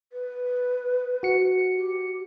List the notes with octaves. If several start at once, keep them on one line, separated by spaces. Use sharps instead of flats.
B4
F#4 C#7
G4